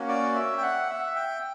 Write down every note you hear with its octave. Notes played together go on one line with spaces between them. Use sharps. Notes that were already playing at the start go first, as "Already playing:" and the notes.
Already playing: A#3 C#4 F#4
D5
E5
G5
F#5
E5
G5